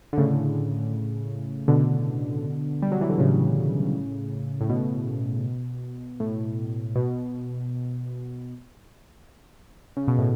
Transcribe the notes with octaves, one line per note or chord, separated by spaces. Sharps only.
D3
A2 C#3
B2 D3
G3
F#3
E3
D3
A2 C#3
A2
B2
A2
B2
C#3
B2
A2